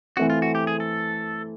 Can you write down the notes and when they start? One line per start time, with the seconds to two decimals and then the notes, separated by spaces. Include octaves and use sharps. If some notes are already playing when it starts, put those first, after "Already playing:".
0.17 E3 A3 C4 F#4
0.30 F4
0.42 F#4
0.55 G4
0.67 G#4
0.80 A4